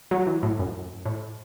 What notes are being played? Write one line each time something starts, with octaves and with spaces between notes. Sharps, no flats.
F#3
E3
A2
F#2
A2